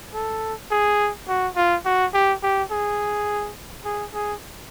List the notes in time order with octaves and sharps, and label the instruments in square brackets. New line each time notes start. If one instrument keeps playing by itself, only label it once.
[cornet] A4
G#4
F#4
F4
F#4
G4
G4
G#4
G#4
G#4